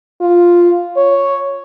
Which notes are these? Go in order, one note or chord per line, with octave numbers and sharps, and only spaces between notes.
F4
C#5